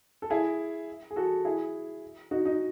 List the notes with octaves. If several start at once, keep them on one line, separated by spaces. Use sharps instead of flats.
A4
E4 G#4
G#4
F#4 A4
E4 G#4
D#4 F#4
D#4